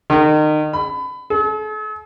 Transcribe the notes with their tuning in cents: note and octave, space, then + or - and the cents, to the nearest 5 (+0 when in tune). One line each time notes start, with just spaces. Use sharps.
D#3 -30
B5 +25
A4 -45